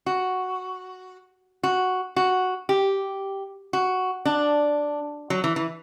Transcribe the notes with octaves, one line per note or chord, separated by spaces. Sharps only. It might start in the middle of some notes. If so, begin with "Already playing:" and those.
F#4
F#4
F#4
G4
F#4
D4
F#3
E3
E3